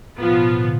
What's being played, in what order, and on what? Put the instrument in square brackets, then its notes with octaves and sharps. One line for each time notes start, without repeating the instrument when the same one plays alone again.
[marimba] A2 [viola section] F3 B3 F4
[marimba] B2
A2
B2
D3